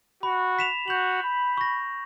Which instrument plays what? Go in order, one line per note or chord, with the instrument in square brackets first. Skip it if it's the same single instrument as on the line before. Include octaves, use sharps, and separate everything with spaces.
[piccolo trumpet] F#4 [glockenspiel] B5
[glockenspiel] B6 E7 F7
[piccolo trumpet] F#4 [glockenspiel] G6 F#7
[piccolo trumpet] B5
[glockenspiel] C#6 A#6